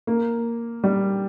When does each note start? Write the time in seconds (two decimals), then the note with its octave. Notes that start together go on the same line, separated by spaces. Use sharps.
0.07 A#3
0.84 G3